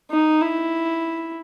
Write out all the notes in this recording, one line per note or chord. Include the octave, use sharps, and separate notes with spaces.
D#4
E4